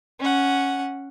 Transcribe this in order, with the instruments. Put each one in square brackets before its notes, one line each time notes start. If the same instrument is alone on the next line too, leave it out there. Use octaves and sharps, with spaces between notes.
[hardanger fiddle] C#4 F#5